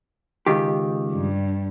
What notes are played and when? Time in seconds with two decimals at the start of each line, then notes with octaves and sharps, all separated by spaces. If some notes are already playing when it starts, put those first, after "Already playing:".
0.46 C#2 D#3 G4
1.12 G2